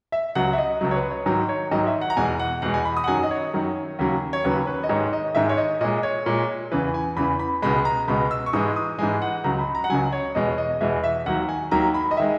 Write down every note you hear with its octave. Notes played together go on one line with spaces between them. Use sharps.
E5
C#2 C#3 F#3 F#5
E5
D#5
C#2 C#3 F#3
C#5
B4
C#5
G#2 D#3 F#3
C#5
G#2 D#3 F#3 D#5
E5
F#5
A#5
E2 B2 G#3 G#5
F#5
E2 B2 G#3 F#5
G#5
B5
D#6
F#5
F#2 D#3 F#3 G#5
D#5
C#5
F#2 D#3 F#3
D#2 C#3 F#3
C#5
D#2 C#3 F#3 B4
B4
D#5
G#2 D#3 G#3 C#5
D#5
G#2 D#3 G#3 E5
C#5
D#5
A#2 G#3 D#5
C#5
A#2 G#3
E2 C#3 E3 B4
G#5
E2 C#3 E3 B5
B5
C#2 B2 G#3 B5
A#5
C#2 B2 G#3 B5
E6
C#6
G#2 E3 G#3 D#6
D#6
G#2 E3 G#3 G#5
F#5
C#2 C#3 F#3 A#5
B5
A#5
F#5
C#2 C#3 F#3 G#5
C#5
E2 B2 G#3 D#5
D#5
E2 B2 G#3 E5
E5
D#2 D#3 F#3 F#5
G#5
D#2 D#3 F#3 A#5
B5
D#5
D#3 G#3 E5